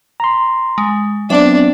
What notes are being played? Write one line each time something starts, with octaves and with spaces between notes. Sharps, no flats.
A#5 C6
G#3
F#3 B3 C4 D4 D5 E5